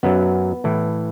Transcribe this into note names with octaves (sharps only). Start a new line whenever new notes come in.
F#2 F#3 B3
A2 E3